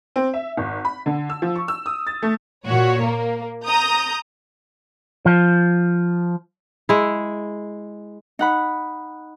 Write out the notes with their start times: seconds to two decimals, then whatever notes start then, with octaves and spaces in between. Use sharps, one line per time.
0.16 C4
0.34 E5
0.57 G#1
0.85 B5
1.06 D3
1.30 E6
1.42 F3
1.56 C#6
1.68 E6
1.86 D#6
2.07 A6
2.22 A3
2.66 A#2 F#4 C#5
3.02 A#3
3.66 A#5 D#6 G6
5.26 F3
6.89 G#3 E4
8.39 D#4 F#5 B5